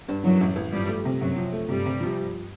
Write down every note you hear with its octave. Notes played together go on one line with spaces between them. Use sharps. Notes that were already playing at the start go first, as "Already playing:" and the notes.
G2
F#2 E3 F#3
A1
A1
G2 F3 G3
A3
C3
F#2 C3 F#3
F3
A3
G2 C3 G3
C3
F3